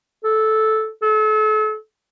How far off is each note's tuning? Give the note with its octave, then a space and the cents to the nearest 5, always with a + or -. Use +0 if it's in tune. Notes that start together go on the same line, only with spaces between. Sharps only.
A4 -10
A4 -35